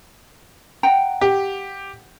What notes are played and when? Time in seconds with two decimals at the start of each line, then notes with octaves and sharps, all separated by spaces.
0.83 F#5 G5 A#5
1.21 G4